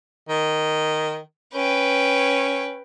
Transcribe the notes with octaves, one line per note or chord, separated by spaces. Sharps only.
D#3
C#4 B4 G5